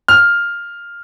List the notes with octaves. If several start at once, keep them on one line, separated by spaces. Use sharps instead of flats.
F6